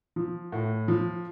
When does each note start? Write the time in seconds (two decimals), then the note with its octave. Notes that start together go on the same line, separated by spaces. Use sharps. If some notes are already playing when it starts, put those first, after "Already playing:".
0.16 F3
0.52 A2
0.88 F3